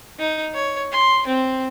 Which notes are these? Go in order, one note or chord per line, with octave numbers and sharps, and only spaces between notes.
D#4
C#5
C6
C4